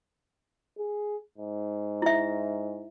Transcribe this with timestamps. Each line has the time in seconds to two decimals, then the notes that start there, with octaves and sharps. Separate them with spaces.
0.78 G#4
1.38 G#2
2.02 E4 E5